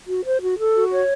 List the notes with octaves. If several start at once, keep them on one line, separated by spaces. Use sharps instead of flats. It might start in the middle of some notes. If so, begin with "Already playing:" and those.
F#4
C5
F#4
A4
F#4
C#5